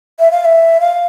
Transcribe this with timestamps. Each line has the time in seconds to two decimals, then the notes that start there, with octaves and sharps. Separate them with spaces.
0.19 E5
0.31 F5
0.45 E5
0.80 F5